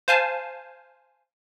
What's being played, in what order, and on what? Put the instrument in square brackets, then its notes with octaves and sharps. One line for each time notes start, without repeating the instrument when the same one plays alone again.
[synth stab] C5 F5 G#5 A5